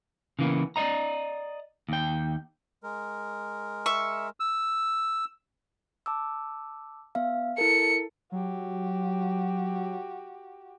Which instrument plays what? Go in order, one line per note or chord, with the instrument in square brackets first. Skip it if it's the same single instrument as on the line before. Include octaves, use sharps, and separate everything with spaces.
[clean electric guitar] C#3 E3 A#3 B3
D5 D#5 A#5
D#2 G5
[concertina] G#3 A#4
[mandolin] E5 C#6
[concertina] E6
[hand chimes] A5 D6 E6
B3 E5 F5
[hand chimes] E4 A#4 [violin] A4 C#7
[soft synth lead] F#3 [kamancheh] F#4 G4